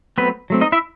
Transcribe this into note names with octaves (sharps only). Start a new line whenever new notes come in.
F#3 A3 B3 C4 B4
F#3 A3 C4
D#4 D#5
E4 E5